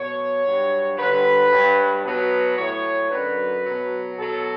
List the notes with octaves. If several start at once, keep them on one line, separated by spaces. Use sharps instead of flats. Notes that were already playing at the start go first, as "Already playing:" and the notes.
Already playing: B2 F#3 C#5
G2 F#3
G2 D3 F#3 B4
G2 F#3
B2 F#3 B4
A2 F#3 C#5
F#2 D3 F#3 B4
B2 F#3
B2 F#3 A4